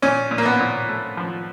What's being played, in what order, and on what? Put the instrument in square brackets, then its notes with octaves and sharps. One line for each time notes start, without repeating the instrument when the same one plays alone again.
[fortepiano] A#2 C#4
A#2
A#3
B3
A#2
A3
F3